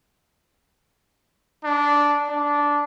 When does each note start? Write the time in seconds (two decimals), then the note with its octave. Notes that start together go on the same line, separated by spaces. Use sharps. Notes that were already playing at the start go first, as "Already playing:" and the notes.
1.65 D4
2.29 D4